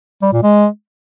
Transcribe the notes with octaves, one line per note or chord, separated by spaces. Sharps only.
G3
A#2
G#3